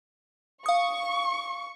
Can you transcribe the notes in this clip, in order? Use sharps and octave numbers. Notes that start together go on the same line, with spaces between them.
F5 C#6 D#6